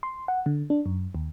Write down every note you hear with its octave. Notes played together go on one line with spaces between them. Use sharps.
C6
F#5
D3
D4
F#2
D#2